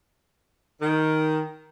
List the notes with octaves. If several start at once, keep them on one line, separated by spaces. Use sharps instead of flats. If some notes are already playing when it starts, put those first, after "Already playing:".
D#3